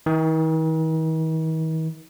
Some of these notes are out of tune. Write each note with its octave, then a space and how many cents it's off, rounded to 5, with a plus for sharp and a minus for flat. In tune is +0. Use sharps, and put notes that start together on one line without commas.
D#3 +45